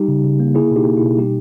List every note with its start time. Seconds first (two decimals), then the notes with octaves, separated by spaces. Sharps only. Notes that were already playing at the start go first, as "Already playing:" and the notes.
Already playing: G3 D#4 G4
0.08 C#3
0.24 C#3
0.40 A#3
0.55 A#3 E4 G#4
0.71 B2
0.76 D#4 G4
0.87 A#3
0.97 B2 E4
1.18 G3 D#4 G4